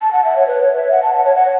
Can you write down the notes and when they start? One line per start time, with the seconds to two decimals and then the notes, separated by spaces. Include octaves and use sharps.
0.02 A5
0.13 F#5
0.24 E5
0.36 C#5
0.47 B4
0.62 C#5
0.76 E5
0.91 F#5
1.03 A5
1.13 F#5
1.25 C#5
1.35 F#5